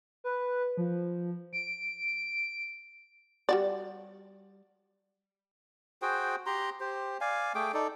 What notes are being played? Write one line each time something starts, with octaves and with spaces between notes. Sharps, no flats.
B4
F3
D7
G3 F#4 D5
F#4 G#4 C5 G5
G4 A#5 C6
G4 C5
D5 F5 G#5
A3 G#4 G5 D6
D#4 A4 D5